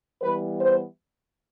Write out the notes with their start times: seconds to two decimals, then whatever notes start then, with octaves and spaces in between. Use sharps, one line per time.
0.22 E3 G3 B3 B4
0.61 C5